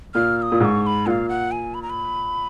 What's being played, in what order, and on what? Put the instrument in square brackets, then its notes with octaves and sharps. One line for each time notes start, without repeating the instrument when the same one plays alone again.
[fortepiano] A#2 [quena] F6
[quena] F6
D#6
[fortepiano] A#2
[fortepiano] G#2 [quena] C#6 D#6
[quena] C#6
B5
[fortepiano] A#2 [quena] F#5
[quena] F5
F#5
G#5
B5
A#5
B5